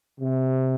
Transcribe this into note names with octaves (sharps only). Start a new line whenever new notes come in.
C3